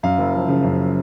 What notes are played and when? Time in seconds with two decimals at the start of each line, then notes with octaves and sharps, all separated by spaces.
0.03 F#2 F5
0.18 F#1
0.33 F3
0.49 C#3
0.64 F#2